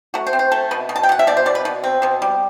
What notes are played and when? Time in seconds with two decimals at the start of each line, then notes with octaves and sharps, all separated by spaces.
0.14 A3 F#4
0.27 C5
0.33 C4
0.39 C5
0.52 A3 A4
0.71 B2 B4
0.89 B2
0.96 A5
1.03 G5
1.09 B2 F#5
1.19 E5
1.27 B2 D5
1.37 C5
1.46 B2 D5
1.55 B4
1.65 B2 B4
1.84 C4
2.02 B2 C5
2.22 G3